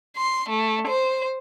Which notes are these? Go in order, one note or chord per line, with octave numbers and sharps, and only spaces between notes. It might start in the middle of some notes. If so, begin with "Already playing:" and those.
C6
A3
C5